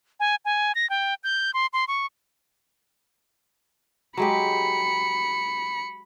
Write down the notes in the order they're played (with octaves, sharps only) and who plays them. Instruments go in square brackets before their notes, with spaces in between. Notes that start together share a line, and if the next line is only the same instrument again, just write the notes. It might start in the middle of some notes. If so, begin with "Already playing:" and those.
[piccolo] G#5
G#5
A#6
G5
G6
C6
C6
C#6
[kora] F#3 G#3 G4 [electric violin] B5 C#7